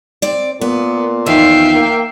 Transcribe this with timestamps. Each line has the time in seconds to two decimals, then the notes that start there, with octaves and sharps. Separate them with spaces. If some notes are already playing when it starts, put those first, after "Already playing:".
0.22 C4 D5
0.61 A#2 B3
1.26 E2 D#3 F3 E5 F5 G5
1.74 A#3